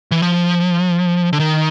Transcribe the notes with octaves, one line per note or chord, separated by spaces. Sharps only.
E3
F3
D3
D#3